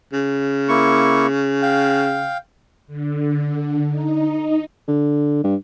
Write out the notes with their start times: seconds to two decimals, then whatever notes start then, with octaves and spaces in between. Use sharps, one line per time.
0.12 C#3
0.69 A#3 E4 C#6
1.62 F5 G5
2.87 D3
3.89 D#4
4.88 D3
5.44 G2